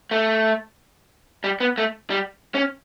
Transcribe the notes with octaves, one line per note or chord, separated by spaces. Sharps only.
A3
G3
B3
A3
G3
C#4